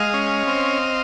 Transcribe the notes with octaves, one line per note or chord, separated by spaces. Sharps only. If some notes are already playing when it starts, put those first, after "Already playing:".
Already playing: G#3 D#5 F5
C#4
C4